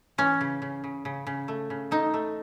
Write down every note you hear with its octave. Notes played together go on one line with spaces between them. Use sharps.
E3 C#4
C#3
C#3
C#3
C#3
C#3
A3
C#3
A3 D#4
A3